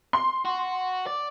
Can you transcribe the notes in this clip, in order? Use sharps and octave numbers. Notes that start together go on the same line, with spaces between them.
C6
F#4
D5